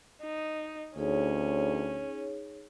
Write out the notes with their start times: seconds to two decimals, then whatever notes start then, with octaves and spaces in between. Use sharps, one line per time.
0.22 D#4
0.97 D2 C#4 D#4 G#4 C#5